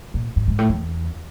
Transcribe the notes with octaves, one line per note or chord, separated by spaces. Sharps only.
A#2
G2
G#2
A2
E2